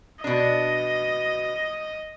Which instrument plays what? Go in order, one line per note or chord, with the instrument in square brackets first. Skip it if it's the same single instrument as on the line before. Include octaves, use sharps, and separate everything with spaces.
[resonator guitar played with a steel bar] B2 D4 [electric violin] D#5